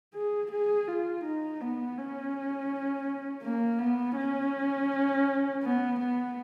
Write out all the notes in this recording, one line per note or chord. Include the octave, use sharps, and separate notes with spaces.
G#4
G#4
F4
D#4
B3
C#4
A#3
B3
C#4
B3
B3